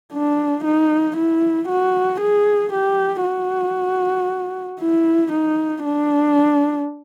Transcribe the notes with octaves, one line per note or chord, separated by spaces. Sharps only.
D4
D#4
E4
F#4
G#4
G4
F#4
E4
D#4
D4